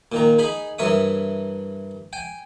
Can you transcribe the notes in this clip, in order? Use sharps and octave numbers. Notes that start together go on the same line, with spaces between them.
A#2 D#3 A#5
D#4 G#4 G#5 B5
G2 E3 A#4 C#5 E5 D#6
G5 G#5